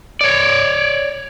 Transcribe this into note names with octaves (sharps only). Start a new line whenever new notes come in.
C#5 D5